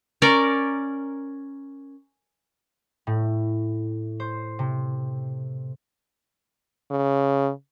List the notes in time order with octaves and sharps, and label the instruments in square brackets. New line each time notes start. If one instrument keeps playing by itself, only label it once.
[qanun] C#4 A#4 D5
[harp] A2
C5
C3
[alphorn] C#3